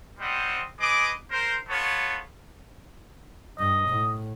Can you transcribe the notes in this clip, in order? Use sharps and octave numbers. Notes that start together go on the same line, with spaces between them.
G3 C4 C5 D#5 F#5
G#4 B4 D#5 D6
A#4 C5
B3 F4 A4 C#5
G2 D#5
A2